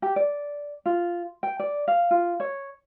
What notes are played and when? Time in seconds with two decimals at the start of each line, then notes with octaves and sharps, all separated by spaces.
0.02 G4
0.16 D5
0.86 F4
1.43 G5
1.59 D5
1.88 F5
2.11 F4
2.40 C#5